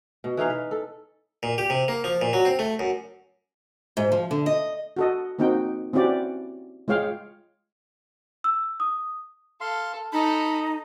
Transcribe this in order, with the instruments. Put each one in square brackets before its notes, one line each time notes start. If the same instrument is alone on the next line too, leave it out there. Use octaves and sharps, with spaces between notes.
[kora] B2
E3 C#4 D#4 F5
B4
A4
[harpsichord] A#2
G4
C3
A#3
F3
A#2
F#3
C4
A3
F#2
[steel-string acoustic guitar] G#2
F3
D3
D#5
[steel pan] F#4 A4 D#5
A#3 C4 D#4 F#4 G5
C4 C#4 E4 F#4 G4 D5
G#3 F4 C#5 F5 G5
[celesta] E6
D#6
[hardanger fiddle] A4 [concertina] F5 C6
[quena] D#4 [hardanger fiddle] A4 A#5 [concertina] B5